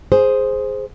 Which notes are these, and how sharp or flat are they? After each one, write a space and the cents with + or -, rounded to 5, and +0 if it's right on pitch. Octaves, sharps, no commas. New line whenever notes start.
G#4 +0 C5 +0